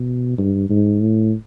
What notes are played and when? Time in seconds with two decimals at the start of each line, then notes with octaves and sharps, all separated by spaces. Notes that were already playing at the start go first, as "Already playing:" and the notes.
Already playing: B2
0.38 G2
0.69 G#2
1.01 A2